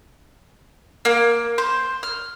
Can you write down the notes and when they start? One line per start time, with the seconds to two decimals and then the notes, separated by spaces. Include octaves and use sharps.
1.05 A#3
1.58 C5
2.03 F6